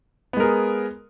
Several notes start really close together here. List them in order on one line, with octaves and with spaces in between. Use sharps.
B3 G#3 A#4 G#4